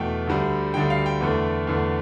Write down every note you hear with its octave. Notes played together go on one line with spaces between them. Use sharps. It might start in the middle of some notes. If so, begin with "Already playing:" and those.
Already playing: E2 B2 A3 G5
D2 D3 G3
D2 D3 G3 G5
F5
G5
E2 D3 A3
E2 D3 A3